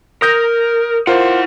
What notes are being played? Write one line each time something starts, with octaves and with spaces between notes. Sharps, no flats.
A#4 D#6 G6 A#6
E4 F4 A#4 C5 F#5